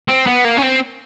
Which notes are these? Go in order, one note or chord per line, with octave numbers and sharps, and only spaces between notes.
C4
B3
A#3
C#4
C4